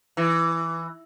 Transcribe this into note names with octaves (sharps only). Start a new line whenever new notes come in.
E3